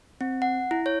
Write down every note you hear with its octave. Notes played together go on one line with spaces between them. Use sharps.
C4
F#5
E4
C#5